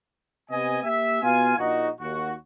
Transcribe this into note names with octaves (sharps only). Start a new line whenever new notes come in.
C3 B3 D#5 G#5
A#3 G4 E5
B2 B3 F4 F5 G#5
A#1 D#4 F#4
D#2 F#4